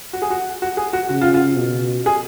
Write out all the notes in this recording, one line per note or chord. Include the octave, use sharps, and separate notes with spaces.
F#4
G#4
F#4
F#4
G#4
F#4
C#3 F#4
F4
F4
B2
G#4